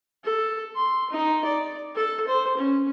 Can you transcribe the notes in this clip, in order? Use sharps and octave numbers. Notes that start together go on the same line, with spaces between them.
A4
C6
D#4
D5
A4
C5
C#4